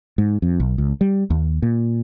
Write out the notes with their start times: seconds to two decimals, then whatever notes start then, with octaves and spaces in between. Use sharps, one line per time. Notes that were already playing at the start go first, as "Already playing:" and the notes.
0.18 G#2
0.42 F2
0.60 B1
0.78 C#2
1.01 G3
1.30 D#2
1.62 A#2